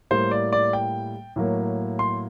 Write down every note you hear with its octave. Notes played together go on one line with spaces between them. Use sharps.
A2 G3 A#3 C5
D5
D5
G5
A2 F#3 A#3
C6